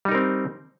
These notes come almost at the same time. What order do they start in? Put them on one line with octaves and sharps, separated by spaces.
G3 D#4 A#4 C4